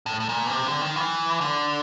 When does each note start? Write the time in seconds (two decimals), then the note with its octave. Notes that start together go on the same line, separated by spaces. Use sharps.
0.06 A2
0.20 A2
0.29 A#2
0.46 B2
0.51 C3
0.66 D3
0.81 D#3
0.96 E3
1.41 D3